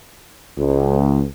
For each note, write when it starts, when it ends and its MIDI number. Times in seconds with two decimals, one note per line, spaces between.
0.57 1.23 37